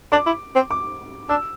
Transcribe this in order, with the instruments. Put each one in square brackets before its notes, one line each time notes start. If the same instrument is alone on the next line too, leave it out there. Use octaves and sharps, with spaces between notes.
[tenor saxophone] D4 [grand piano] D6
[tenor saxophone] E4
C4
[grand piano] D6
[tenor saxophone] D4 [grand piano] E6